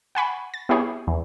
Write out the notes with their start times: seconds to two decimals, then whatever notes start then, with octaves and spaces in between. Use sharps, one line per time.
0.15 F#5 G#5 B5 C#6
0.54 A6
0.69 B3 E4 G4 G#4 C#5
1.07 E2